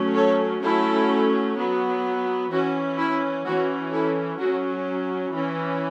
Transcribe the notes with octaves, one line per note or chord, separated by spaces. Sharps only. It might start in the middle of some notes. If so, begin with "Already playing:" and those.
Already playing: F#3 A3 C#4
A4 C#5
F#3 A3 C#4 E4 A4
F#3 B3
E3 C#4 F#4
E4
E3 C#4 F#4
E4 A4
F#3 C#4 F#4
E3 C#4